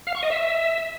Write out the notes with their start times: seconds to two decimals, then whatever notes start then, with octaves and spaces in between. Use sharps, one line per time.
0.07 F5
0.15 C#6
0.23 D#5
0.31 E5